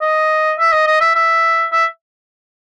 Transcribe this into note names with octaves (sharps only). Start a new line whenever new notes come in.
D#5
E5
D#5
D#5
E5
E5
E5